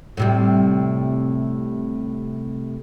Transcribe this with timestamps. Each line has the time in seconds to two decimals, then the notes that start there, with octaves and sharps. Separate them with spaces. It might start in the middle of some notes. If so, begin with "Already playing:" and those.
0.17 A2 C3 G3